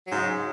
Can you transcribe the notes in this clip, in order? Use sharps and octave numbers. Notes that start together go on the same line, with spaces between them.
G#2 C#3 F#3